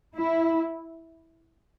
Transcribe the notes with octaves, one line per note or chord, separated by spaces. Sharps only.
E4